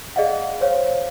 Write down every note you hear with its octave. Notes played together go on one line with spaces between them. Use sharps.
G#4 D5 D#5 F5 F#5
C5 C#5 F5